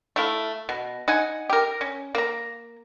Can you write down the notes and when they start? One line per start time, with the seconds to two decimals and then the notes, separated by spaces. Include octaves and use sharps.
0.16 A3 E4 F5
0.69 B2
1.08 D#4 F#5 G#5
1.50 G4 A#4
1.81 C#4
2.15 A#3 A#5